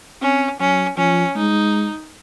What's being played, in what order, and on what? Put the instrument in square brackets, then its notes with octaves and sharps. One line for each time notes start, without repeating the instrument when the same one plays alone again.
[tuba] C4 [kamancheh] C#4
[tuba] F#3 [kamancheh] C#4
[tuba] F3 [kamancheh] C#4
[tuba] G#3 [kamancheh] D#4